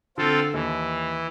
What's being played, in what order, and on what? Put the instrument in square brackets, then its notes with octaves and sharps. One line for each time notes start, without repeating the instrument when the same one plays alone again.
[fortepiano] D3 [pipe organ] C4 F4 A4
[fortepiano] D#2 [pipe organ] E3